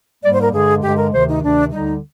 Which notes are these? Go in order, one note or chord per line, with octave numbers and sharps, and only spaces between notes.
G#2 G3 A#3 D5
C5
A#4
G2 D3 G#3 G#4
G2 D3 G#3 G4
A#4
D2 C3 D#3 C5
D#4
D2 C3 D#3 D4
D2 D3 G3 D#4